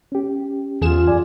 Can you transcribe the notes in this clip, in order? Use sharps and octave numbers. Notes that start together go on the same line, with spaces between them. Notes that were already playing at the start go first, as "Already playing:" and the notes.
C#4 G4
E2 F4 G#4 E7
F#2 D5 G#5